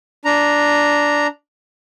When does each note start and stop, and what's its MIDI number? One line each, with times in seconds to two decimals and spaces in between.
0.25 1.27 62
0.25 1.27 82